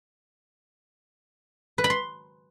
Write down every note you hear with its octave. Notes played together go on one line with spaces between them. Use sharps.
B4
B5
C6